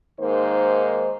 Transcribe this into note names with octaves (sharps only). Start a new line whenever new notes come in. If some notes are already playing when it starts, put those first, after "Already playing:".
G#2 D#3 A#3 C5